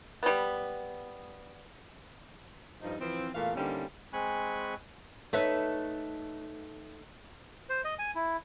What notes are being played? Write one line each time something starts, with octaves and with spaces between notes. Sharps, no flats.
G3 B3
G2 F3 D#4
E3 F3 C4
E2 A#2 E3 A3 F5
D3 G3 A#3 C4 C#4 D#4
G#3 C4 G#5 B5 C#6 F#6
A3 D#4 B4 C#5 E5
C5
D#5
G#5
E4